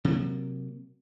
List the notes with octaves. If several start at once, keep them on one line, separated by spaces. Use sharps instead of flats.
C3 F#3 A#3